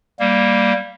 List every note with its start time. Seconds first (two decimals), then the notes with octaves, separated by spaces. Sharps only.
0.20 G3 A#3